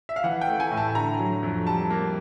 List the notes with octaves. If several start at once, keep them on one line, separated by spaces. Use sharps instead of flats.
E5
F5
E3 F#5
G5
A3
G#5
A2
A5
D3 A#5
F#3
F2
G3 A5
A#3